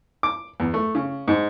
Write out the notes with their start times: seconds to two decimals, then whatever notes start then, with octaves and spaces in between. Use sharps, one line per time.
0.23 D6
0.60 E2
0.74 A3
0.95 C#3
1.28 G#2